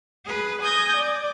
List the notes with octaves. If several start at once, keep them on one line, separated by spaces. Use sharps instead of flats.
G#4 B4
G#5 D#6 G6 G#6 A#6
D5